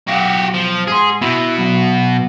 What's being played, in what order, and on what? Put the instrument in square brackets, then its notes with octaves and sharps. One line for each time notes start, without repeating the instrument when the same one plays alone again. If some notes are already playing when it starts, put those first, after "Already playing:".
[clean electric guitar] B1 F5 [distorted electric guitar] F#4 G4
[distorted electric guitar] F3
[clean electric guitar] G#2 C6 [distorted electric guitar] G#4
[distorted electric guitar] B2 [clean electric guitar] E4
[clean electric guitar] F#3 B3